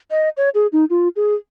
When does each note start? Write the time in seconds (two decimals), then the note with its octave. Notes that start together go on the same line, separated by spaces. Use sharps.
0.11 D#5
0.37 C#5
0.55 G#4
0.73 D#4
0.90 F4
1.16 G#4